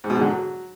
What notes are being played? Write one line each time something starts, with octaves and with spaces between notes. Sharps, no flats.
G#2
B2
G#2
D3
F#3